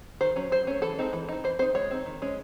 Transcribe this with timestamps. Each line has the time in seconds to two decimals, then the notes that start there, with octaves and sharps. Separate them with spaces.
0.21 D#3 C5
0.36 F#3 C#4
0.52 F#3 C5
0.67 A3 C#4
0.82 E3 A4
0.99 G#3 C4 D#4
1.13 E3
1.29 C4 D#4
1.44 E3 C5
1.59 C4 C5
1.62 D#4
1.75 G#3 C#5
1.91 C4 D#4
2.06 D#3
2.22 G#3 C#4